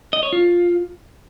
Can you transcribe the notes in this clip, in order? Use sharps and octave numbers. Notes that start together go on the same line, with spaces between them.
D#5
C#5
F4